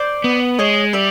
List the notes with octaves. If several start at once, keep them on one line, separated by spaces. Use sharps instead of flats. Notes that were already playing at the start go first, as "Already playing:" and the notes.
Already playing: C5 D5
B3
G#3 C#5 D#5
G3 D5 E5